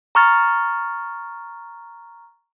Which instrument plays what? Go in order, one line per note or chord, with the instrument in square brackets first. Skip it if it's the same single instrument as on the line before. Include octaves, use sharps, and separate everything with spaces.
[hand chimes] A#5 C#6 F6 A6